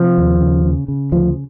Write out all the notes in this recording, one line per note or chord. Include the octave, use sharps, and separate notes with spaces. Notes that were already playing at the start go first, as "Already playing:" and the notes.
Already playing: C3 F3
D#2
C#3
C#3
C#3
D2 F3